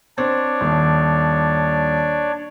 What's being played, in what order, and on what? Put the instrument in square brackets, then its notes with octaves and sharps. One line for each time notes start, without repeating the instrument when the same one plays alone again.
[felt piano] C4 [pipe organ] D4 C#5 D5
[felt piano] D#1